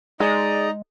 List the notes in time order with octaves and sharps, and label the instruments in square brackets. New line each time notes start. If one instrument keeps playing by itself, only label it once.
[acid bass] G#3 [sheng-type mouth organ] D#4 D#5 A#5 [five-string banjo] G#4 [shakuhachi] D5